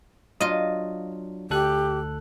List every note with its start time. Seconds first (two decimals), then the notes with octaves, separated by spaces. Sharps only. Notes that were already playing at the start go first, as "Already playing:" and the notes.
0.40 F#3 D4 F4 D#5
1.50 D2 G4 A4 F#6